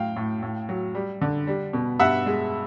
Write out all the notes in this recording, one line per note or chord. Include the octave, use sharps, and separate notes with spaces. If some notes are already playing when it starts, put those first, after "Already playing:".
Already playing: A2 F#3 F5 G5
A2
A2
F#3
G3
D3
G3
B2
G2 E5 F#5
G#3